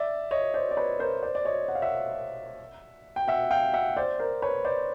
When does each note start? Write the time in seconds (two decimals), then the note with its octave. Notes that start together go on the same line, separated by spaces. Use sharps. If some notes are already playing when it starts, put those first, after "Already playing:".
Already playing: D5 E5
0.31 C#5 D#5
0.54 C5 D5
0.71 D5
0.77 B4 C#5
0.99 A#4 C5
1.22 C5 D5
1.35 D5
1.45 C#5 D#5
1.68 F#5
1.75 F5
1.82 E5 F#5
3.16 G5
3.28 E5 F#5
3.51 F5 G5
3.73 E5 F#5
3.97 C5 D5
4.19 A#4 C5
4.42 B4 C#5
4.65 C5 D5